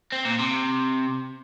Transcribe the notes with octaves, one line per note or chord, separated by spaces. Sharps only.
C4
A#2
C3